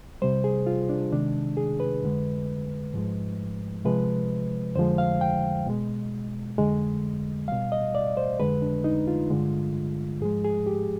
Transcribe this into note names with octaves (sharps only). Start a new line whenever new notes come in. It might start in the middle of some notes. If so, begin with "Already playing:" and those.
C3 G3 C5
G#4
F4
D4
C3 D#3 G#3 D4
G#4
B4
F2 D3 G#3
G#2 F3 G#3
C3 F3 G#3 B4
F2 D3 F3 G#3 C5
F5
G5
B2 G#3
F2 D3 G#3
B2 G3 F5
D#5
D5
C5
F2 D3 G#3 B4
D4
D#4
F4
G2 D3 G#3
G#2 F3 G#3 G#4
G#4
G4